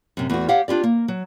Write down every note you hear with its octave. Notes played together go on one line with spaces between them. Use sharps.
F#2 C3
E2 A3 F#4
G4 C#5 F5 F#5
D4 F4 G4 D5
A#3
F#3